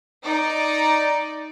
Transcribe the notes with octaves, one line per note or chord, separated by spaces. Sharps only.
D#4 D5